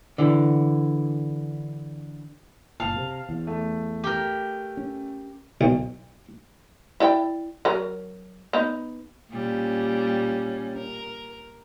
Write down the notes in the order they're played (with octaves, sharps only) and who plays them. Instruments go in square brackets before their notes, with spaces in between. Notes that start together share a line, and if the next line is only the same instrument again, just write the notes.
[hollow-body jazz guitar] D3 E3
[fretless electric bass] F#1 A#2 [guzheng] F5 [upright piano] A5
[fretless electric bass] C3
E2
[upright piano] A3
[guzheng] G4 A#4
[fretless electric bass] C#4
[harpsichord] B1
[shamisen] E4 D5 G5
F#3 A#4
B3 D#4
[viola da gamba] A#2 G3 C#4
A#4